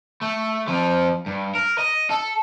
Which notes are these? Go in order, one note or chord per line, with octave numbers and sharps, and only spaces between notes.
A3
F2 F3
G2
A#4
D#5
A4